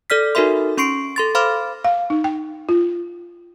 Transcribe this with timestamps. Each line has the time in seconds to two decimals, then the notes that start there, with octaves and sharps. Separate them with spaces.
0.10 A4 D5 F6 B6
0.35 D#4 F#4 A4 A#4 E5 C6
0.77 C#4 C6 C#6 C7 D7
1.16 A4 C6 A6
1.35 C5 F5 B5 C6 D6 F6
1.84 F5
2.10 D#4
2.24 G5
2.69 F4